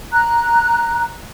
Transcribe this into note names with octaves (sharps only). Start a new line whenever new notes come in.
A#5 F#6